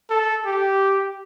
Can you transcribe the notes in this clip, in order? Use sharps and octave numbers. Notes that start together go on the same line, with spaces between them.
A4
G4